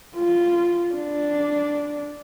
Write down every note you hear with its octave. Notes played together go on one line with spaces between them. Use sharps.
F4
D4